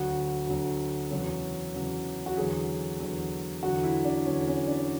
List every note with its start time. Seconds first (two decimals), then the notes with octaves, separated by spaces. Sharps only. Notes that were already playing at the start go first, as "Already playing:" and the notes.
Already playing: D2 D3 F#3 F#4
0.47 D2 D3 F#3
1.11 E2 C#3 F#3
1.74 E2 C#3 F#3
2.26 F#4
2.37 E2 D3 F#3 G#4
3.00 E2 D3 F#3
3.63 E2 D3 F#3 F#4
3.84 E4
4.05 D4
4.26 E2 D3 F#3 C#4
4.47 C#4
4.67 D4